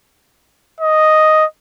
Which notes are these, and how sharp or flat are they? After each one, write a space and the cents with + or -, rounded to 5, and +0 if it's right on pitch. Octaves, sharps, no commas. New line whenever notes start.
D#5 +0